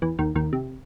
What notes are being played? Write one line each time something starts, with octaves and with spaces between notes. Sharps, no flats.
E2 E3
D#2 D#3
D#2 D#3
C3